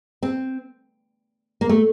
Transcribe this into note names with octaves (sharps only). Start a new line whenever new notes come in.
C4
A#3
A3